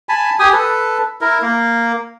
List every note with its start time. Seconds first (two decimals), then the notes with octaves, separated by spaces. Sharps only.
0.09 G#5 A5 B5
0.39 G4 G#5 D#6
0.53 A4 B4
1.21 E4 A#4
1.42 A#3